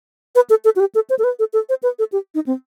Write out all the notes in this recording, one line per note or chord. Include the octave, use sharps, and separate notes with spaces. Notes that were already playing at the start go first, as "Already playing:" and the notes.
B4
A4
A4
F#4
G4
A4
C5
A4
B4
A4
A4
C5
B4
A4
G4
D#4
C4